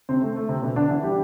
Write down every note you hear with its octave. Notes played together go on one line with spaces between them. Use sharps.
C3 C4
A3
A3
C3 C4
B2 B3
D3 D4
E3 E4
G3 G4